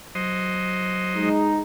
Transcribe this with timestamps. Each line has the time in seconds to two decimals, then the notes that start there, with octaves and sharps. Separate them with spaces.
0.15 F#3 C5 D#5
1.16 G#3 D#4